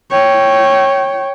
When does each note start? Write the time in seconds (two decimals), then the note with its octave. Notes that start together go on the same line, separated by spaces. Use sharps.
0.11 C#5 G5